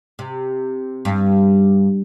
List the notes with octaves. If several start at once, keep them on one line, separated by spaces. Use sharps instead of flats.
C3
G2